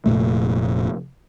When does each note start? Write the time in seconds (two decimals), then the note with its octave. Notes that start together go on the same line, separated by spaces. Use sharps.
0.06 F1 A#2 A3